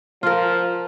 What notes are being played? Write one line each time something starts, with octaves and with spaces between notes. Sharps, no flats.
F3 F4 A#4